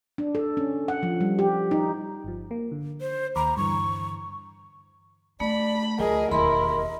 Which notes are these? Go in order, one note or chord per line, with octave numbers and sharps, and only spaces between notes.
D4
A4
C#4
F#5
F3
G3
G4
D#4
G1 F3
A#3
D3
C5
D#2 A#5 B5 D6
G2 D3 E3 C#6
A3 D4 D5 B5
D2 F3 G#4 A#4 D#5
E1 D#2 E4 A#4 D#5 B5 C6